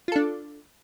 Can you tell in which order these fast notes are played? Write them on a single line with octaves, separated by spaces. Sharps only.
F4 A4 D4